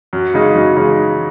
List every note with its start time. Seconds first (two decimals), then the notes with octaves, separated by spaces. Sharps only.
0.13 F#2
0.34 C#3 G#3 D#4
0.55 F#2
0.76 C#3 G#3 D#4